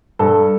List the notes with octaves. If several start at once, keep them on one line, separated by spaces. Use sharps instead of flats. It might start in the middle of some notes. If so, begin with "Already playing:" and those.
G2 A4